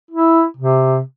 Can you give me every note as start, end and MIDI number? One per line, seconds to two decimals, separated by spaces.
0.11 0.44 64
0.57 1.00 48